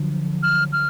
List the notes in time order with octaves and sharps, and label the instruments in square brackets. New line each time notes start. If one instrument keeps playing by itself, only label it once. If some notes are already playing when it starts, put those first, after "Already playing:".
Already playing: [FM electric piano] D3 F3 F#3
[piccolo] F6
F6